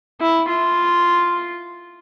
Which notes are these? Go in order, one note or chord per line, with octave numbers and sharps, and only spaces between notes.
E4
F4